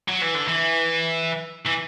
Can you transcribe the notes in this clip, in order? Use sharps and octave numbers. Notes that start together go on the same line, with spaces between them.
F#3
E3
D3
E3
E3